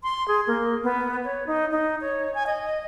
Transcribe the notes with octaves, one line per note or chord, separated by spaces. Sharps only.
C6
G#4
A#3
B3
C#5
D#4
D#4
C#5
G#5
D#5